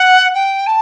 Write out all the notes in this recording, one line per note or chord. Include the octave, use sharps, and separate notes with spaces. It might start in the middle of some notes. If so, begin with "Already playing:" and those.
Already playing: F#5
G5
A5